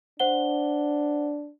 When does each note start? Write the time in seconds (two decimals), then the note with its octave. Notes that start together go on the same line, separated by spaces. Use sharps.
0.20 D4 C5 F#5 G7